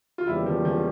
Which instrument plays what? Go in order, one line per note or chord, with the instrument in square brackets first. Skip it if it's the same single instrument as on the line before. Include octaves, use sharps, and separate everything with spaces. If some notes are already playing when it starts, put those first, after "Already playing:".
[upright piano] F4
[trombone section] E2 C#3 G3 A#3 C#4 [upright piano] E4
[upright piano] F3
F3